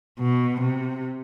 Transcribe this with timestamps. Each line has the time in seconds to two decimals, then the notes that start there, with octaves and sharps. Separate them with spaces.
0.19 B2
0.61 C3